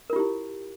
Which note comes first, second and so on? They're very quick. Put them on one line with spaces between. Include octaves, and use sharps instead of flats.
A#4 F4 G4 E4